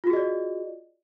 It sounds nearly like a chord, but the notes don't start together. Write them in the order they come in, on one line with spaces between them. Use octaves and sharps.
F4 F#4 G#4 D#5 D5